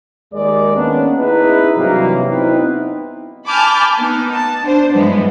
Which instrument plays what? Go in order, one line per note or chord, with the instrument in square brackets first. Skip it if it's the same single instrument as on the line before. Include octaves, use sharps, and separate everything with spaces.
[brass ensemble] D#2 G#3 A#4 D5
D#3 A#3 B3 C#4 D4
D#4 E4 G#4 B4
G2 C3 E3 F#3 A#3
B3 C4 D#4 E4 B4
[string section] G#5 A5 B5 D6 F6 G6
B3 D#4
A5
D4 C5
G2 E3 F#3 G#3 B3